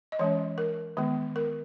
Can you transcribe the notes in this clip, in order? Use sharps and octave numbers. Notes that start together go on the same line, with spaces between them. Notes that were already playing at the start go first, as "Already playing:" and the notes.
D#5
E3 G#3 C#4 C#5
A#4
D#3 G#3 B3
A#4